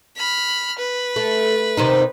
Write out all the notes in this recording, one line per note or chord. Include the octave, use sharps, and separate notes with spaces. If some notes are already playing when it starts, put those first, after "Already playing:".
B5 F6
B4
A3
C3 D#3 D#4